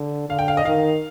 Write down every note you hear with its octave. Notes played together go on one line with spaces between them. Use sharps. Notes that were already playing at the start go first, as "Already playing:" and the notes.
Already playing: D3
D3 F5
G5
F5
D#5
D#3 F5